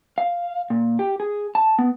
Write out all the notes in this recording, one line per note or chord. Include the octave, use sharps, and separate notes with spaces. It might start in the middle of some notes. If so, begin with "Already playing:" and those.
F5
A#2
G4
G#4
A5
B3